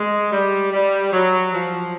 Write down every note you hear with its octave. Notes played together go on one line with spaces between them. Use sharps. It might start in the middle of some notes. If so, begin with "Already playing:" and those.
Already playing: G#3
G3
G3
F#3
F3